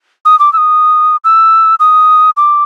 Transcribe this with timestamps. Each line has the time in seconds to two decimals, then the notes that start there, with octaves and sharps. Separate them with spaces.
0.25 D#6
0.39 D6
0.53 E6
0.57 D#6
1.24 E6
1.80 D#6
2.37 D6